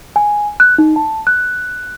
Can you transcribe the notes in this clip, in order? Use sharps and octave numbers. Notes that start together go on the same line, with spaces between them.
G#5
F#6
D#4
A5
F#6